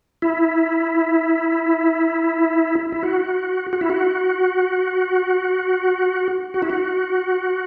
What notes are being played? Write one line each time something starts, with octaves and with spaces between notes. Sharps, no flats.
E4
E4
F#4
F#4
E4
F#4
F#4
E4
F#4